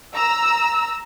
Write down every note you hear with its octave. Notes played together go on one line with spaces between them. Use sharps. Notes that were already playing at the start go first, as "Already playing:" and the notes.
A#5 E6